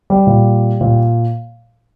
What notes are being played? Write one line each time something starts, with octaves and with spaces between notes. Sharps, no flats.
G3
A#2
A#2